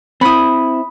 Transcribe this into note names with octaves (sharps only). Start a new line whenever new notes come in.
C4 E4 B5 D#6